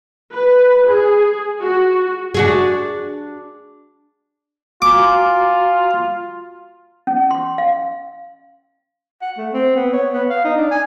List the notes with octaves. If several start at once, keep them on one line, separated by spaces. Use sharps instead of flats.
B4
G#4
F#4
D4 F#4 G#4
F4 F#4 G#5 A#5 D6
C#4
C6
F5
F#5
A3
C4
B3
C#5
B3
F5
D#4
D4
G#5